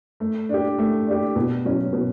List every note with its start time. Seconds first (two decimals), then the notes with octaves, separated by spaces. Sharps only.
0.20 A3
0.49 D4 G4
0.79 A3
1.07 D4 G4
1.36 B2
1.65 F#3 C#4 F#4
1.93 B2